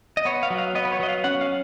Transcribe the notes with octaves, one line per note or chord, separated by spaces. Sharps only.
D#5
B3 C#5
F5
F#3
F5
B3 D#5
B4
C#5
F#3 D#5
F5
C#4 F#5
F5